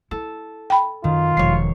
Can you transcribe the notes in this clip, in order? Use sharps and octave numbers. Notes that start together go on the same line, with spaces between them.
E4 A4
G5 B5
F#2 D#3 F4
E1 F3 C#5 C7